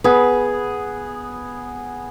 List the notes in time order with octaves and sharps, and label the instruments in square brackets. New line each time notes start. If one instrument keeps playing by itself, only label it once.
[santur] B3 G#4 [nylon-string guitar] B4